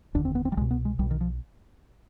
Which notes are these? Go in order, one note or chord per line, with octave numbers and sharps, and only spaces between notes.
F1 D#2 D3 D4
C4
B3
C4
G3
C2 B2 G#3
B3
G#3
B1 B2 G3
D#3
F3